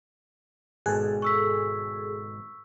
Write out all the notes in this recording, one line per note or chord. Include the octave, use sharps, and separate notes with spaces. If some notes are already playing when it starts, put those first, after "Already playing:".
G#1 B2 G#4 A4 F#6
C#6 E6 B6